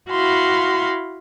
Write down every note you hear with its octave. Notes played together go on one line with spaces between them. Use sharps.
E4 F#4 F5 B5 C6